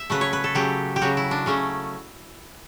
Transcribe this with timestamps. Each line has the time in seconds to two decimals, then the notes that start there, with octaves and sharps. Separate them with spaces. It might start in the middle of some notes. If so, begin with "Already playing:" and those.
Already playing: E5
0.10 C#3 F#3 A3 B4
0.21 C#5
0.33 B4
0.44 A4
0.55 C#3 F#3 A3 G4
0.96 G4
1.01 C#3 F#3 A3 F#4
1.17 E4
1.31 D4
1.46 C#3 F#3 A3 C#4